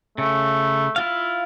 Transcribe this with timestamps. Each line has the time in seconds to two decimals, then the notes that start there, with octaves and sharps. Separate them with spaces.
0.18 C#3 A3
0.96 E4 F4 F5